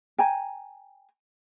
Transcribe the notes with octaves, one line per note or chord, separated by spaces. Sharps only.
G5 G#5 A#5